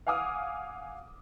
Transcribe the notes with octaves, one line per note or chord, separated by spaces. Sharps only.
F5 F#5 G#5 D6 D#6 F6